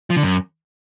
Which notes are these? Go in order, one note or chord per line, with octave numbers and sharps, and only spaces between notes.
F3
D3
F#2